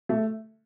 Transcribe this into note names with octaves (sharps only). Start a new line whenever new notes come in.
A3